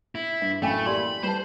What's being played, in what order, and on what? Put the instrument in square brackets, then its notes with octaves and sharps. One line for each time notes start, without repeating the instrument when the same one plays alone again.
[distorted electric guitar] E4
[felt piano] G2 [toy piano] E5
[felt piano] A1 F#2 B5 [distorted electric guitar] A3 [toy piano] F5 G5 G#5
[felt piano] A#3 [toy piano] G4 D5 C6 [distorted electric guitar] B5
[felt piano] G3 B4 A5 [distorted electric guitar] C5